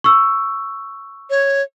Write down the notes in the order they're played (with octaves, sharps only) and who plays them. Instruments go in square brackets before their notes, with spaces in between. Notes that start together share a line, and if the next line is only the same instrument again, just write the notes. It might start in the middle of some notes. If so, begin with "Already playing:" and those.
[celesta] C#6 E6
[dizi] C#5